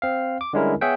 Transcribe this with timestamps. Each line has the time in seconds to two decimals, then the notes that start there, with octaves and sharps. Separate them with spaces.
0.02 C4 F5
0.41 D6
0.53 D3 G3 G#3 C#4 E4 A#4
0.81 B3 G#4 C#5 E5 F#5 G5